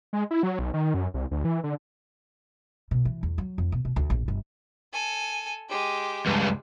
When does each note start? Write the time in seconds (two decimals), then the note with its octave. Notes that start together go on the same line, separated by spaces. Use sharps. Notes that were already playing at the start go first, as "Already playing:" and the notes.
0.13 G#3
0.31 E4
0.43 F#3
0.59 B1
0.74 D#3
0.94 F#2
1.14 C2
1.31 D2
1.45 E3
1.64 D3
2.91 B2
3.05 E3
3.23 E2
3.38 F#3
3.58 F2
3.72 B2
3.85 B2
3.96 D2
4.10 A#1
4.28 G1
4.93 A4 G#5
5.70 G#3 G4
6.26 C#2 G2